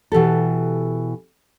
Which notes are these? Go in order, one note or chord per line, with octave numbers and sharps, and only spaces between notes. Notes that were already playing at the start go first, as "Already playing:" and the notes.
B2 E3 G4 A4